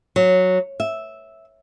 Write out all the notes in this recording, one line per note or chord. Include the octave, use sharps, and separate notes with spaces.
F#3
E5